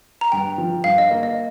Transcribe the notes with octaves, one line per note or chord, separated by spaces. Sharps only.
A#5
G2 G5
F3
G2 F5
D#5
A#3
D#5